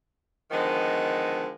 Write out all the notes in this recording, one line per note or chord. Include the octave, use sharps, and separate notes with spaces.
D3 D#3 F3 G#3 B3